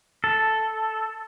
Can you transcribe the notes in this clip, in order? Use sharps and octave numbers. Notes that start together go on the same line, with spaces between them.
A4